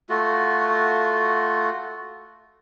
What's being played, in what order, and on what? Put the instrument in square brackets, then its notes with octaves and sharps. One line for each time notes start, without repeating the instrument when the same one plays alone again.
[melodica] A3 F4 F#4